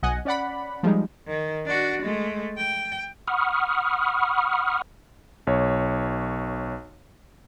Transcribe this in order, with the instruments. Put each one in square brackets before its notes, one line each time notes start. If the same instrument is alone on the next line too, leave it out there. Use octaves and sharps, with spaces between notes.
[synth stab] B1 D#5 F#5 G#5
C#4 D5 F#5 B5
F3 G3 G#3 D#4
[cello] D#3
D4 F#4
G#3 A3
G5
[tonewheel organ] F#5 B5 C#6 D#6 F6
[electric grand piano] B1 C#5